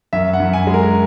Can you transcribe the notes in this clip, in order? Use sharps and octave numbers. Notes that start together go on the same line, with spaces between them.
F#2 E5
F#5
F#2
G#5
G#3
A#4